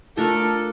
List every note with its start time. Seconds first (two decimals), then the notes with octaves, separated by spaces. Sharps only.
0.17 A3 D4 F4 A4 A#4